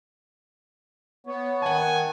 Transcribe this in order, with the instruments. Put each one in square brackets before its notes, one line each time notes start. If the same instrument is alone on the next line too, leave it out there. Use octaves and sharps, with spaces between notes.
[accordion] B3 [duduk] C#5
[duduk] D#3 [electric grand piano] F#5 A5 [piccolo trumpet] G#5